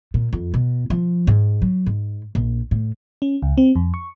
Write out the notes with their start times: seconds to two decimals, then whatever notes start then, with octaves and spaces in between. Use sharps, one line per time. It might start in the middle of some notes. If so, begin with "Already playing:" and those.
0.14 A#2
0.33 F2
0.54 B2
0.90 F3
1.27 G#2
1.62 F#3
1.86 G#2
2.35 A#1
2.71 A2
3.22 C#4
3.42 C#2
3.58 C4
3.76 F2
3.94 C#6